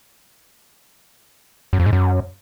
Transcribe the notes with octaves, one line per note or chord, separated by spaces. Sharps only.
F#2
F2
G#2
F#2